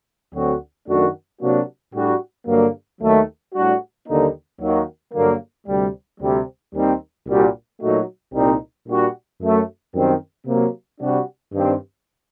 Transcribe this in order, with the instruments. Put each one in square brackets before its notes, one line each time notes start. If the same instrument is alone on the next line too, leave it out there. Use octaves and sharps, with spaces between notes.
[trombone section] D2 D3 F#3 C4 F#4
F#2 D#3 A3 D4 F#4
C3 F#3 A#3 D4 F#4
A2 G3 D4 F#4
G2 D3 F#3 A#3
D#2 D#3 F#3 A3
A2 G3 D4 F#4
D#2 D3 G3 A#3 D#4
D#2 D#3 F#3 A#3 F#4
G2 D3 F#3 A#3
D2 C3 G3
D2 C3 G3
D#2 D#3 G3 C4 D#4
C2 A#2 G3 D4 F#4
A#2 F#3 A3 D#4 F#4
C2 A#2 G3 C4 D#4
A#2 G3 D4 F#4
F#2 F#3 A3
F#2 D#3 G3 C4
C3 F#3 A#3
C3 G3 D4 F#4
G2 D#3 G3 C4